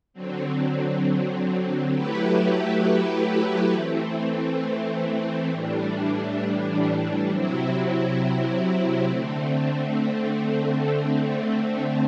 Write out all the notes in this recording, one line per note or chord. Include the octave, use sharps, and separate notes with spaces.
D3 F#3 C4
F#3 A3 E4 G4 B4
E3 A3 C4
A2 E3 G3 D4
C3 F#3 C4 E4
D3 A3 C4